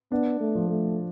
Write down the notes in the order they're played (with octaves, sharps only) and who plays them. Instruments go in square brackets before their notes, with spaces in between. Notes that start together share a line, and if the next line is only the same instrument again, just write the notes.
[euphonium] B3 [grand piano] D4
[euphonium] A3
[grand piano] F3
[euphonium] A3